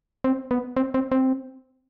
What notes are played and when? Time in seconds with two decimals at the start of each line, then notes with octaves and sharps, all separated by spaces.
0.24 C4
0.51 B3
0.77 C4
0.94 C4
1.12 C4